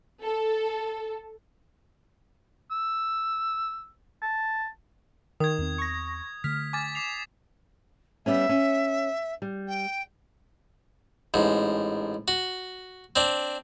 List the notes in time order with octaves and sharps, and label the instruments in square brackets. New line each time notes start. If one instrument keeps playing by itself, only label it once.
[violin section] A4
[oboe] E6
A5
[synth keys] D#3 [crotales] D#6 G#6
[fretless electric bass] E2 C4
[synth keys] C#6 A#6
[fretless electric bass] D3 A3 [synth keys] F6 [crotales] B6
[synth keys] G#5 [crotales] D6 A6
[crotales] D6 C7 F7
[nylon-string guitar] G3 B3 C#4 [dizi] E5
[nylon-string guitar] C#4
G3
[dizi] G5
[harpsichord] A1 G#2
F#4
C4 D4